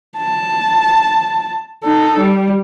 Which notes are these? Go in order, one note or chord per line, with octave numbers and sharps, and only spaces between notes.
A5
D#4 A4
G3